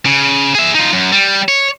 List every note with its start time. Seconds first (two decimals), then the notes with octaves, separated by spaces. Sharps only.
0.06 C#3
0.55 G#4 E5
0.75 D#4 F4
0.93 F#2
1.12 G3
1.48 C#5